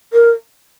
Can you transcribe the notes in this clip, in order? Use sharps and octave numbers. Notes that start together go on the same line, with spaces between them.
A#4